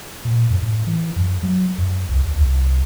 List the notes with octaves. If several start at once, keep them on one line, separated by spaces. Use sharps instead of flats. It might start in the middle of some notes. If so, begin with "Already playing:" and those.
A#2
F#2
A2
E3
F#2
F#3
F#2
C2
D2
C2